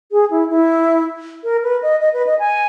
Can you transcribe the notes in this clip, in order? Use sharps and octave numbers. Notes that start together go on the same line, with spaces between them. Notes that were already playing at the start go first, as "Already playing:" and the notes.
G#4
E4
E4
A#4
B4
D#5
D#5
B4
D#5
G#5